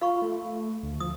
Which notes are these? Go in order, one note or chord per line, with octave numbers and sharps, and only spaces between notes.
F4 F5 B5 C#6
A3
D2
F3 D#6